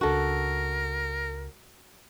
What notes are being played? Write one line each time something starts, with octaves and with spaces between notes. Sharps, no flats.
C#2 D4 F#4 A4 A#4